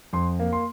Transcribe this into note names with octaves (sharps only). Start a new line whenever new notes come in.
F2 C6
A#3
C6